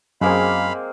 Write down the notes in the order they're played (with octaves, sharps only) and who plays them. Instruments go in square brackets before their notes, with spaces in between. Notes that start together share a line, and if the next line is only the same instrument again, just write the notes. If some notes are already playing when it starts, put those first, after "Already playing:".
[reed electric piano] F#2 G#4 [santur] G#3 A#3 C4 [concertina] F5 B5